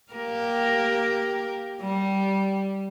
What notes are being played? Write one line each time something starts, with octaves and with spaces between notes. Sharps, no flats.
A#3 G4 A#4
G3